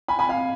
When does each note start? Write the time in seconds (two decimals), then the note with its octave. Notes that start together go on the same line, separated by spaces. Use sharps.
0.08 G#5 B5
0.19 G#5 B5
0.29 F5 G#5